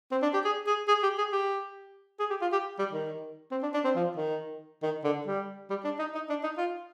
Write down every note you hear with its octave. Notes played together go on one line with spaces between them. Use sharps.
C4
D4
G4
G#4
G#4
G#4
G4
G#4
G4
G#4
G4
F4
G4
G3
D#3
C4
D4
D4
C4
F3
D#3
D#3
D3
G3
G3
D4
D#4
D#4
D4
D#4
F4